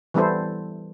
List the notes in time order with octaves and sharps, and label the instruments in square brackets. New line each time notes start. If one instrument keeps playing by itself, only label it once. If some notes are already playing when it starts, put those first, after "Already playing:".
[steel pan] E3 G3 B3 E4 A4 C5